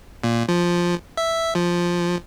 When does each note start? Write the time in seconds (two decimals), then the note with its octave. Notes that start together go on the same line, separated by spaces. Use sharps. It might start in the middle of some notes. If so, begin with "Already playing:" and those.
0.24 A#2
0.48 F3
1.17 E5
1.55 F3